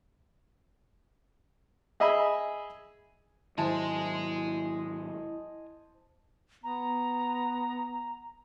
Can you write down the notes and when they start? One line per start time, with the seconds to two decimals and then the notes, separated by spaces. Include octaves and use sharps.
2.00 G#4 D#5 E5 G#5 B5
3.58 G#2 D#3 F#3 E4 C5 D#5 G#5 A5
6.64 B3 A#5